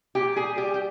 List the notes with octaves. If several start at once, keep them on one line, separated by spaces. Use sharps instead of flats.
A#2 G4
G3 G#4
G3 G4
G4